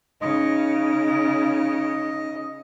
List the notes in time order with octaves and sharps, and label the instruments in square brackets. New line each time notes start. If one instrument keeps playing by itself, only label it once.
[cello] C#3 [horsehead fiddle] D#4 [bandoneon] D#5